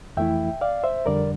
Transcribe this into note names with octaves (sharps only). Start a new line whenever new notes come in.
F2 E3 A3 E4 E5 G5
D5 F5
C5 E5
F2 D3 G3 A#4 D5